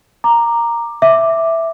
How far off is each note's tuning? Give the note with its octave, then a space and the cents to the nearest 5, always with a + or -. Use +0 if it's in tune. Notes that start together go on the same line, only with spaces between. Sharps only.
A#5 +0 D6 +15
E5 +0 D6 +0